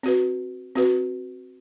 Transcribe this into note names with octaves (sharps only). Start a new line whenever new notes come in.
C4 F#4 B4
C4 F#4 B4